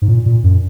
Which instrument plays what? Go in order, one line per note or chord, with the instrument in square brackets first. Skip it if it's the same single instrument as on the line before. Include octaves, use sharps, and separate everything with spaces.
[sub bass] G#2
A#2
A#2
F#2